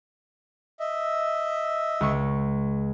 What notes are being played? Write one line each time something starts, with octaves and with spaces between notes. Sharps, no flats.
D#5 E5
C#2 C#6